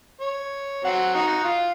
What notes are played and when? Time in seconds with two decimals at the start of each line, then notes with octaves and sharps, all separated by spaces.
0.20 C#5
0.84 F#3 C4 F#5
1.14 D#4 F#4
1.44 F4